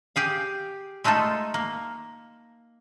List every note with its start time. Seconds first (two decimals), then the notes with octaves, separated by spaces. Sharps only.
0.16 G4 G#4 F5
1.04 G#3 A3 D#4 F4 A4
1.54 A#3